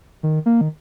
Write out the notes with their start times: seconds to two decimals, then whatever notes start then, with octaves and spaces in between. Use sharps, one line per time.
0.23 D#3
0.46 A#3
0.61 D#3